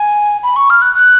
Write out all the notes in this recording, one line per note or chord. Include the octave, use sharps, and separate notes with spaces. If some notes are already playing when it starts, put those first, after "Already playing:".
Already playing: G#5
B5
C#6
F6
F#6
F#6